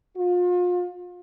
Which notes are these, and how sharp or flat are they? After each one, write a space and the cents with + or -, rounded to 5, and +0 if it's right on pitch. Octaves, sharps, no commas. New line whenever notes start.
F4 +35